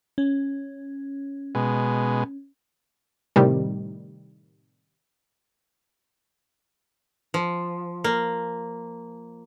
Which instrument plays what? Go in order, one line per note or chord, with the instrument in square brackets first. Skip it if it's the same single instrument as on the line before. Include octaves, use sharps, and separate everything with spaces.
[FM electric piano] C#4
[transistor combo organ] B2 G#3
[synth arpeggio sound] A2 C3 D#3 G3
[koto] F3
A#3